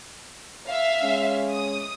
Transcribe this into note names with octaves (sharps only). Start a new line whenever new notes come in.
E5 F5
G#3 C#4
D#6